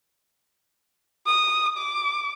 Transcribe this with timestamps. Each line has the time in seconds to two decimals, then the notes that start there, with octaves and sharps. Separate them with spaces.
1.27 D#6
1.78 D6